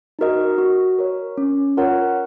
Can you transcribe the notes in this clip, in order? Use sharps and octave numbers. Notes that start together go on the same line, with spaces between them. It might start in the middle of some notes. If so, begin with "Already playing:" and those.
D#4 F#4 A#4 D#5
F#4
A#4 C#5
C#4
F4 A#4 C#5 F#5